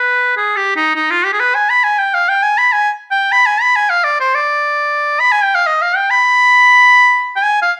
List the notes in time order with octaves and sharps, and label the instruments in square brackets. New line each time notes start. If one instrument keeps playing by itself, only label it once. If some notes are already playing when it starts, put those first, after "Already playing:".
Already playing: [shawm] B4
G#4
G4
D#4
D#4
F4
G4
G#4
B4
G#5
B5
G#5
G5
F5
G5
G#5
B5
G#5
G5
B5
G#5
B5
G#5
F5
D5
C5
D5
B5
G#5
G5
F5
D#5
F5
G5
B5
G5
G#5
F5